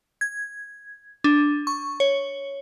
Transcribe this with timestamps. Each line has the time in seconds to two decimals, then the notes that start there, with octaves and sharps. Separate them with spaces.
0.21 G#6
1.24 D4
1.67 C#6
2.00 C#5